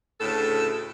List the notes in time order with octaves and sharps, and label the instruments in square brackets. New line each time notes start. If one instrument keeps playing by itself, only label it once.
[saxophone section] D2 A2 C#3 A4